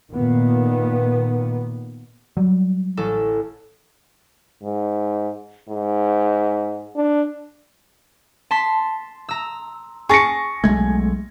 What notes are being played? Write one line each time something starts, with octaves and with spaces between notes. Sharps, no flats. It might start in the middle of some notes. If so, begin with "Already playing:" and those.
A#2 D#3 B3
F#3 G3
A1 A4
G#2
G#2
D4
A5 C6 B6
A#5 E6
G#4 A5 C#6 A#6 C#7
B1 G#3 A3 G#6